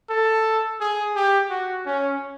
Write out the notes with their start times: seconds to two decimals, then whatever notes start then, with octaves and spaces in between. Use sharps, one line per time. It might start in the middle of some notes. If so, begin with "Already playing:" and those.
0.10 A4
0.80 G#4
1.15 G4
1.50 F#4
1.86 C#4